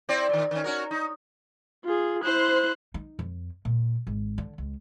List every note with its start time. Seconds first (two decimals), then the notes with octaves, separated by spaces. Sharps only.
0.09 C4 E4 D5
0.29 A#2 D#3
0.51 D#3 C#4
0.64 C#4 F#4 A#4
0.91 D#4
1.85 F4 G#4
2.23 E4 C5 F#6
2.94 D#4
3.19 F2
3.65 A#2
4.07 G#1
4.38 D3
4.58 C#2